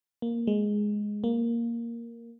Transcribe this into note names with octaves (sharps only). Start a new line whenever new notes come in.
A#3
G#3
A#3